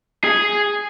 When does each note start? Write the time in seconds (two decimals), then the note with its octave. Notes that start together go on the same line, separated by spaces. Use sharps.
0.24 G#4